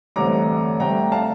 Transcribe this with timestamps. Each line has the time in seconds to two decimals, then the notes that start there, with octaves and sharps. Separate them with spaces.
0.16 A1 G2 D3 A3 C4 A#5 D6
0.80 G2 D3 A3 C4 G5 A#5
1.12 F5 A5